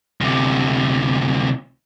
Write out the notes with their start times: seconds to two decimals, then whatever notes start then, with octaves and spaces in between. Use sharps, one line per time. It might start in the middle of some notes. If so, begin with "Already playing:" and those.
0.21 D2 C3